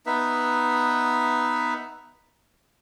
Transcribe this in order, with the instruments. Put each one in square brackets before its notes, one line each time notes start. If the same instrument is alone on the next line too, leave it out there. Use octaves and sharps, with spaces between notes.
[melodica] B3 D#4 B4 E5